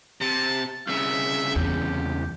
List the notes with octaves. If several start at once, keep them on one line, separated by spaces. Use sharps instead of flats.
C3 A5
C2 C#3 E5
E2 G4